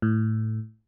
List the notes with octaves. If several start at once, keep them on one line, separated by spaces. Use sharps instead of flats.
A2